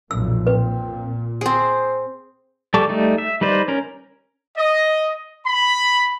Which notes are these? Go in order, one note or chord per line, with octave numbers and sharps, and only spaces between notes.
B1 F2 A#2 E6
A#2 C4 B4
C4 G#4 C5
G3 A4 A5 C#6 D6
G3 A3 D#4
E5
G3 D#4 B4 C5 D5
C#4 A#4
D#5
B5